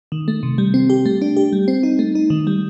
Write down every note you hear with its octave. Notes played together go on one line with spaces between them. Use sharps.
D#3
A3
C3
G3
C4
G4
A3
D4
G4
G3
C4
D#4
A3
D#4
D#3
G3